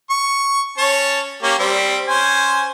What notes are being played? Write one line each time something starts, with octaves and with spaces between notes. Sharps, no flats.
C#6
C#4 C#5 A5
A#3 C#4 G4
G3 C4
C#4 C5 G#5